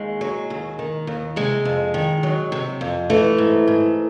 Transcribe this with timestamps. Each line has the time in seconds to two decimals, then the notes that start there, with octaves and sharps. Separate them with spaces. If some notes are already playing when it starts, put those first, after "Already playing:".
Already playing: D#2 G#3
0.21 F#3
0.50 D#2
0.79 D#3
1.07 D#2
1.36 C3 G#3
1.65 F2
1.94 D#3
2.23 F#3
2.52 C3
2.81 F2
3.10 E3 A3
3.38 G#2
3.68 G#2